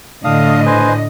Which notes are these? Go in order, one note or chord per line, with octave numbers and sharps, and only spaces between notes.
A2 D3 D4 D#5 F5 D#6
B4 C5 G#5